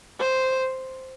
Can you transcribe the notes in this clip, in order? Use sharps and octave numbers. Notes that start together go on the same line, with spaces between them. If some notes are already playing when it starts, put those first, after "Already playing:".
C5